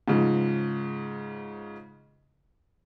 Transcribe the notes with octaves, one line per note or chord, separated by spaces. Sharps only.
G#2 C#3 F3